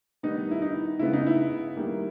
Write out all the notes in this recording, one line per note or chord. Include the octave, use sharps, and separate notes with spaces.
D#3 G3 B3 D#4
E4
D#4
C#3 G#3 B3 E4
D#4
E4
D#3 G3 A#3